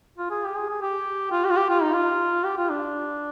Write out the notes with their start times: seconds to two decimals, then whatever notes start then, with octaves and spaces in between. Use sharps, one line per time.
0.18 F4
0.30 G#4
0.44 G4
0.56 G#4
0.69 G#4
0.81 G4
1.32 F4
1.44 G4
1.50 F4
1.57 G4
1.70 F4
1.82 D#4
1.93 F4
2.44 G4
2.58 F4
2.70 D4